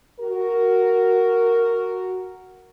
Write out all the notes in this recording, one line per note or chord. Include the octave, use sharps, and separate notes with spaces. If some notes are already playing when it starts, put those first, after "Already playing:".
F#4 A#4